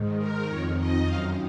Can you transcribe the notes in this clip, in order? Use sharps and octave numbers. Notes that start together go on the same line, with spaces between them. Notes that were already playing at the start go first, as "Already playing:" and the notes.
Already playing: G#2 D#3
A#4
F2 D#3 C#5
D#5
F#2 D#3 F5